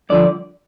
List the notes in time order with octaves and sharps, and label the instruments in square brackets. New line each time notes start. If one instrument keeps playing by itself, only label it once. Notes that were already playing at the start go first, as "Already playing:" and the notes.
[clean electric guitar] G2 D3 F3 D5